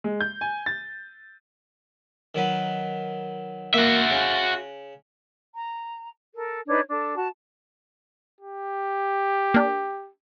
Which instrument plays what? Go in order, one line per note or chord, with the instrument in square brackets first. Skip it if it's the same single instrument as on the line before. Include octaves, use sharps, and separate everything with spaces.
[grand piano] G#3
G6
G#5
A6
[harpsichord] D#3 F#3 B4
[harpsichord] A#3 [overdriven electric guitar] F#4 E5
[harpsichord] C#3
[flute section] A#5
A4 A#4
D4 D#4 B4 C#5
D4 A4
F#4 A5
[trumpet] G4
[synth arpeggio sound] A#3 D4